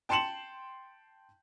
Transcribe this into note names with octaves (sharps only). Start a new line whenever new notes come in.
G5 A5 C6 C#7 E7 F#7